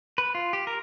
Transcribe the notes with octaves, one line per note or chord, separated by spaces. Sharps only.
B4
F4
G4
A#4